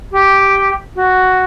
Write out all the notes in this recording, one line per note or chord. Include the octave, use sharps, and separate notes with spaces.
G4
F#4